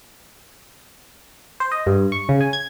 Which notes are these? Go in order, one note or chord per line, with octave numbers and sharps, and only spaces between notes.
C5
D#5
G2
C#6
C#3
G#5
G#6